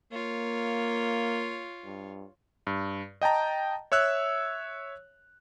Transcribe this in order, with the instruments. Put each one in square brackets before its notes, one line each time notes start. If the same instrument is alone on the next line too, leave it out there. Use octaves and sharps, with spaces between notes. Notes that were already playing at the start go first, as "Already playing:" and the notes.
[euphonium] A#3 [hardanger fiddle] F4 C#5
[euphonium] G2
[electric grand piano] G2
D#5 G5 A5 A#5
C#5 E5 E6 F#6